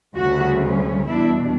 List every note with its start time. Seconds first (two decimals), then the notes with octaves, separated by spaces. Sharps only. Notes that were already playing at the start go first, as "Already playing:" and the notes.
0.16 D2 C#3 G3 C#4 F#4
1.07 E2 B2 G3 D4 E4